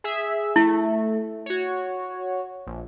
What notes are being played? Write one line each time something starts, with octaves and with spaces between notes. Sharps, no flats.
G#4 E5
A3 E4
F#4 C#5
A#1